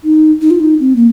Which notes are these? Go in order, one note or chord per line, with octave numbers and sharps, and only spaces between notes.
D#4
D#4
F4
D#4
C4
A#3